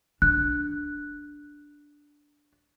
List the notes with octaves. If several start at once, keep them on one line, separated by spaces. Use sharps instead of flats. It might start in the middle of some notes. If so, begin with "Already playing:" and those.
D4 F#6